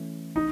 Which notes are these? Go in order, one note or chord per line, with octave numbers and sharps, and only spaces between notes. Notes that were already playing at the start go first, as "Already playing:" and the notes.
Already playing: E3 A3 C#4
D#4